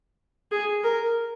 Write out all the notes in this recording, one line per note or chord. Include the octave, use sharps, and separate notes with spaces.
G#4
A#4